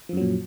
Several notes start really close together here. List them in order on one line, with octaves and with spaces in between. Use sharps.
F3 F#2 F#3 A#2